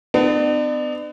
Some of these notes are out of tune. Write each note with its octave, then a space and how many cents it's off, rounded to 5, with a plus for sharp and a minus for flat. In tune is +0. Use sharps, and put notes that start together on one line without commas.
B3 +35 D4 +40